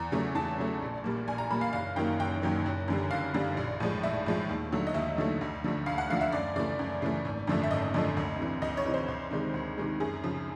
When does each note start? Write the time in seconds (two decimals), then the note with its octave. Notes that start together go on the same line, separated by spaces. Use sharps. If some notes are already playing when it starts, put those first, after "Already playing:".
Already playing: E2 A#5
0.12 C#3 F#3 A3
0.35 E2 A5
0.58 C#3 F#3 A3
0.82 A#1
1.04 A#2 G3 A#3
1.28 A#1 G#5
1.38 A#5
1.51 A#2 G3 A#3 B5
1.61 F5
1.73 F#1 F5
1.96 F#2 D#3 F#3 A#3 G5
2.19 F#1 G5
2.42 F#2 D#3 F#3 A#3
2.66 F#1
2.88 F#2 D3 G3
3.11 F#1 F5
3.34 F#2 D3 G3
3.57 A#1
3.80 A2 F3 G#3
4.03 A#1 E5
4.26 A2 F3 G#3
4.49 D#2
4.72 D3 F#3 A3
4.87 D#5
4.94 D#2 E5
5.18 D3 F#3 A3
5.41 D2
5.64 D3 F3 A3
5.86 D2 F5
5.98 F#5
6.10 D3 F3 A3 F5
6.21 E5
6.32 F#2 D5
6.56 C#3 E3 A3 D5
6.79 F#2
7.02 C#3 E3 A3
7.25 G#1
7.47 F#2 D3 F3 A3
7.63 E5
7.71 G#1 D#5
7.94 F#2 D3 F3 A3
8.17 D2
8.39 C3 E3
8.62 D2 D#5
8.77 C#5
8.85 C3 E3
8.94 C5
9.08 D2
9.31 C3 D#3 G#3
9.54 D2
9.78 C3 D#3 G#3
10.00 F#2 G#4
10.24 C#3 F3